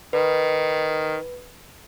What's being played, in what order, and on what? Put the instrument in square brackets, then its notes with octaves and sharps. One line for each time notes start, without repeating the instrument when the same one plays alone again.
[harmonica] D#3 [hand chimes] B4